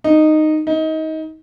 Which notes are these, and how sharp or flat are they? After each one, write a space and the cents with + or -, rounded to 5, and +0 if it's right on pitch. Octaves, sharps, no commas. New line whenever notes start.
D#4 -10
D#4 +25